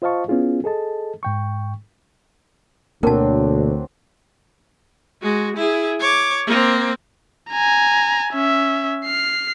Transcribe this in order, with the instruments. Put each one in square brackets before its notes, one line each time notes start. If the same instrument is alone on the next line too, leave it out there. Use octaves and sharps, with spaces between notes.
[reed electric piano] F4 C5 D#5 F5 A5 C#6
B3 C#4 E4 F4 G#4
G#4 A4 D#5 A5
G#2 G5 C#6
[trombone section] D2 [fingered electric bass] B2 A#3 [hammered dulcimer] F#3 C4 D4 [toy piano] A#4 A5
[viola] G#3 F#4
E4 G#4
C#5 D6
A#3 C4
[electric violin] G#5 A#5
C#4 E5
F6 C7